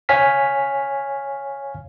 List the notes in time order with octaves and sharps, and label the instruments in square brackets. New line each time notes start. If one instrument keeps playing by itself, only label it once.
[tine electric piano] C#5 F5 G#5 F6 B6